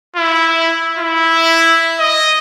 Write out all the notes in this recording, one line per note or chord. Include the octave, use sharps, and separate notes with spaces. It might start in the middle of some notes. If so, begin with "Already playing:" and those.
E4
E4
D#5